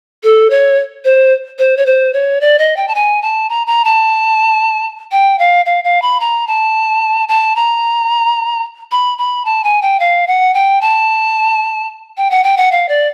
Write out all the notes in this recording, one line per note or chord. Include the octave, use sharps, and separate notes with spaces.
A4
C#5
C5
C5
C#5
C5
C#5
D5
D#5
G5
A5
G#5
A5
A#5
A#5
A5
G5
F5
F5
F5
B5
A#5
A5
A5
A#5
B5
B5
A5
G#5
G5
F5
F#5
G5
A5
G5
F#5
G5
F#5
F5
D5